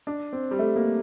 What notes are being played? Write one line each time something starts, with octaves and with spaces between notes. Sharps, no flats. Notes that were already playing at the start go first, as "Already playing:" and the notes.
D4
C4
G3
A3
A#3